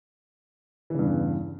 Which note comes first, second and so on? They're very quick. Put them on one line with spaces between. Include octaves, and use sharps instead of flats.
E3 C#3 G2 E2